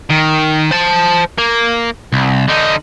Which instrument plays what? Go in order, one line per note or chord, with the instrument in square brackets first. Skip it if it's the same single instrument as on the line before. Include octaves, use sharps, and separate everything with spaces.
[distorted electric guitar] D#3
C5 A5
A#3
C2
D3 D#4